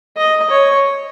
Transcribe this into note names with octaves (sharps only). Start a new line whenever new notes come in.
D#5
C#5